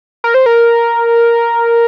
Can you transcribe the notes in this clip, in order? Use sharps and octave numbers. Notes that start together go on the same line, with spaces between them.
A#4
C5
A#4